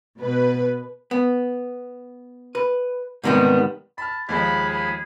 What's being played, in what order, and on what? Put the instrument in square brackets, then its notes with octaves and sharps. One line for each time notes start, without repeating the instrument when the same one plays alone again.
[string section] B2 B4
[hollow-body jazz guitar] B3
B4
G#2 C3 D#3 G3 B3
[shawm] A5 [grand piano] B5 F6
[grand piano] D#2 F3 G#3 [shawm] G#4 [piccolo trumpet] B5
[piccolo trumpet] B5